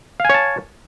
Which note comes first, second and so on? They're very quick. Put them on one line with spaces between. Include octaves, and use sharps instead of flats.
F5 G#5 C#5 A5